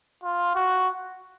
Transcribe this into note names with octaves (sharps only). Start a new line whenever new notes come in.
F4
F#4